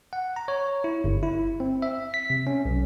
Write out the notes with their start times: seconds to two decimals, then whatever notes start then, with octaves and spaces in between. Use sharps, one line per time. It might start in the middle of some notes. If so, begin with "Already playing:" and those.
0.13 F#5
0.36 A#5
0.48 C#5
0.84 E4
1.04 G1
1.23 E4
1.60 C4
1.82 E5
2.14 B6
2.30 C3
2.47 C#4
2.65 B1